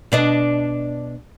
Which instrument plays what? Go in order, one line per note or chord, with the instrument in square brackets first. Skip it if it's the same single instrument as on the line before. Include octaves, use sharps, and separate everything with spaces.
[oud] B2 D4 D#5